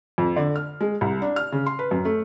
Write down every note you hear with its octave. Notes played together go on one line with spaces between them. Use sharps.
F2
D3
F6
G#3
C2
D4
F6
C#3
C6
B4
F#2
A3